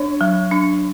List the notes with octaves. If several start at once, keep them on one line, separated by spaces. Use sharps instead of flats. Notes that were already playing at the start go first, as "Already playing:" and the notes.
Already playing: D4 C#5
F#3
D4